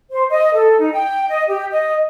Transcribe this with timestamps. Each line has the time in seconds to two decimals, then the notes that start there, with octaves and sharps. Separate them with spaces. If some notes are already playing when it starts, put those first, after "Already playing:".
0.11 C5
0.30 D#5
0.54 A4
0.79 D#4
0.92 G5
1.28 D#5
1.49 G4
1.71 D#5